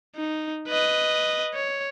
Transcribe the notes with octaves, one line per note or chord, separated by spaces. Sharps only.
D#4
B4 D#5
C#5